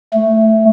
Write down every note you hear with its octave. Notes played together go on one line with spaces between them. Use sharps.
A3